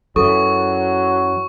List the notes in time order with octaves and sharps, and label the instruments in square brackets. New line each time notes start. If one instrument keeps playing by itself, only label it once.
[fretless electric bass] F#2 E3 [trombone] F#3 [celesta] A4 [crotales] C#6